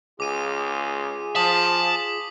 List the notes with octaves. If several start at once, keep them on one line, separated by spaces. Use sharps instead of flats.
C#2 F4 G#4 D6 D#7
F3 A5 D#6 B6 F#7